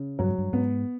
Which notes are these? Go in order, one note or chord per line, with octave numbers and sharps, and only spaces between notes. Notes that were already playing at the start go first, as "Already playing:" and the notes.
Already playing: C#3
G2 F#3
G#2
G2
G#2 B3